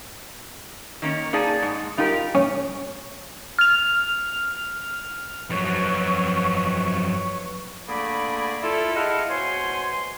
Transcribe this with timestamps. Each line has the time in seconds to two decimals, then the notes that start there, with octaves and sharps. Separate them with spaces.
1.02 D#3 A#3 C#4
1.33 A#3 D#4 G#4 D5 A5
1.62 G#2
1.97 G3 D#4 F4 G4 A#4
2.35 C#4
3.59 F6 F7
5.50 F2 F#3 B4 C#5 C#6
7.89 D3 A3 A#3 G#4 D5 B5
8.62 E4 F4 A4
8.95 E4 G#4 D#5 F5 F#5 A5
9.29 B2 C5 C#5 G#5 C6